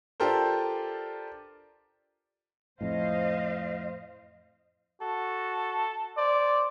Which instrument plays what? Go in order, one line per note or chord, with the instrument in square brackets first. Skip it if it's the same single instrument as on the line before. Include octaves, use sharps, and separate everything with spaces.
[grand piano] D4 F4 G4 A4 A#4 C5
[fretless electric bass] F2 A2 [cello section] C5 D#5 F5
[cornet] F#4 [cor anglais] A4
[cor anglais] C5 [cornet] D5